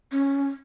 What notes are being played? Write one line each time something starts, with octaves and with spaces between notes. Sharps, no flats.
C#4